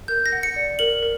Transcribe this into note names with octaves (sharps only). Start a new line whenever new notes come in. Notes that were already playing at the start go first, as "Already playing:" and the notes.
A#4 G6
A#6
F#5
C#7
D5
A#4 F#7
A#4